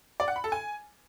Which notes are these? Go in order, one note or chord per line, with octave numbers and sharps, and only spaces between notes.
D5
F#5
B5
A4
G#5